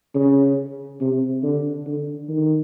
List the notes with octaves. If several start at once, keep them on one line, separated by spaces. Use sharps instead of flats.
C#3
C3
D3
D3
D#3